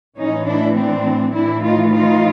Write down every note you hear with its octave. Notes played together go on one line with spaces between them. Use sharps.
A2 E3 C#4 D#4
D4 E4
C4 D4
A2 E3 D4 E4
D#4 F4
D#4 F4